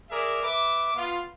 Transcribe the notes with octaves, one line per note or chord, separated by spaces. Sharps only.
G#4 A#4 D5 E5
B4 E5 D6
B3 F4